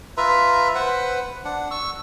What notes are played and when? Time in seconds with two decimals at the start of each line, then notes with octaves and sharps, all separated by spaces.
0.17 F4 B4 E5 A#5
0.75 B4 C5 F#5
1.45 D4 F#5
1.71 C#6 E6